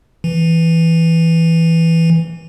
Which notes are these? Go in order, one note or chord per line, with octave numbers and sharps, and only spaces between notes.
E3